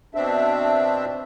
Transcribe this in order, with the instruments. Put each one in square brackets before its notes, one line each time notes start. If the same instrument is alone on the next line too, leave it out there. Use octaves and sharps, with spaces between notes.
[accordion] B2 C4 D4 E5